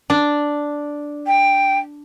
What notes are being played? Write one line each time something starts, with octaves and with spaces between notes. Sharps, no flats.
D4
G5